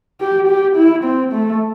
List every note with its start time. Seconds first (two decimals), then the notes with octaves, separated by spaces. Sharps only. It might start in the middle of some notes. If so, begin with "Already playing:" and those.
0.20 G4
0.48 G4
0.76 E4
1.04 C4
1.33 A3